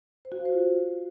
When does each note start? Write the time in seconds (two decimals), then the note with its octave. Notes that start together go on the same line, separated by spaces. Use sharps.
0.25 C5
0.32 F#4
0.39 F5
0.45 C5
0.52 F4